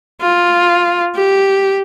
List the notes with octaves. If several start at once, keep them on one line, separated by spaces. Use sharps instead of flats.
F4
G4